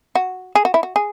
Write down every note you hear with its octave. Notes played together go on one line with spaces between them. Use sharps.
F#4
G#4
F#4
E4
F#4
G#4